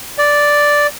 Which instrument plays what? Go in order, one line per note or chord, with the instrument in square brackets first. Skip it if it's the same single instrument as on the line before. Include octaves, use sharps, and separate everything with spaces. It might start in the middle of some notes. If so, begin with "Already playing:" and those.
[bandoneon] D5